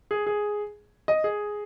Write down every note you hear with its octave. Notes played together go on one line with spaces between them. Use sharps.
G#4
G#4
D#5
G#4